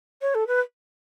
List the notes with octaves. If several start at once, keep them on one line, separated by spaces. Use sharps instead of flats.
C#5
A4
B4